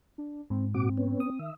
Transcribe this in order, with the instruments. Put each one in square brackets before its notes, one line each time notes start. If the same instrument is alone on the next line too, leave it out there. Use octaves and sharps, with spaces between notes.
[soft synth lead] D4
[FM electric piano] G#2 [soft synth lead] C4
[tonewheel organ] A#2 F#4 D6 [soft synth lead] C4
[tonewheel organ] B3 C#4
[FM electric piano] D#6
[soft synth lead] D#3 [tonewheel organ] E5